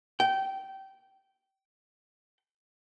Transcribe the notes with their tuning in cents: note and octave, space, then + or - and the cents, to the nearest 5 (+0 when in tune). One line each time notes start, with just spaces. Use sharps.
G5 -20